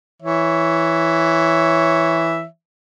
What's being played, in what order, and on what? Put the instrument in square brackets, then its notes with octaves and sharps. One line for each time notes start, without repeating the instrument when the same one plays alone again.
[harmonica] E3 C#5 E5